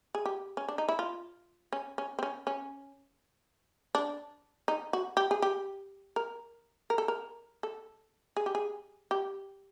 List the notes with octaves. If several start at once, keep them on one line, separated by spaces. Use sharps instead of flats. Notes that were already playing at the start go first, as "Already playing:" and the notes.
G#4
G4
C#4
D4
D#4
E4
F4
C#4
C#4
C4
C#4
C#4
D4
D#4
F#4
G4
G#4
G4
A#4
A#4
A4
A#4
A4
G#4
G4
G#4
G4